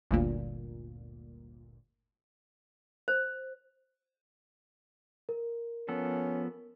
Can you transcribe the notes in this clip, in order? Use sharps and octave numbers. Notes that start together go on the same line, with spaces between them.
G1 D2 A#2
C5
A#4
F3 B3 C#4 A4